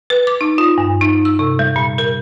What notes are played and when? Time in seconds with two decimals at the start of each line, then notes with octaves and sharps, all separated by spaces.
0.10 B4
0.27 D6
0.41 D#4
0.58 F4
0.78 G2
1.01 D#4
1.25 E6
1.39 C3
1.59 G3
1.76 A#2
1.98 A#4